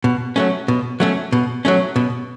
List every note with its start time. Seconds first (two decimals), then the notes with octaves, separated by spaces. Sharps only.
0.04 B2
0.36 F#3 A3 C#4
0.68 B2
1.00 F#3 A3 C#4
1.32 B2
1.65 F#3 A3 C#4
1.96 B2